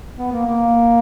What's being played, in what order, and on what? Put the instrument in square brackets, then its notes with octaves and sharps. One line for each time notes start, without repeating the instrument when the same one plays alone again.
[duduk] B3
A#3
A#3